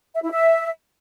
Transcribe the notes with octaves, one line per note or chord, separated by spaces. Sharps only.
E5
E4
E5